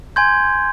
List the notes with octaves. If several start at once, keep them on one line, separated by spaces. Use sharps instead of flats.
G#5 C6 G6 G#6